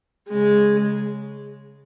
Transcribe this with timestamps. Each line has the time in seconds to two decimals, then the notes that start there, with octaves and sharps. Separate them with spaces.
0.29 C#3 G#3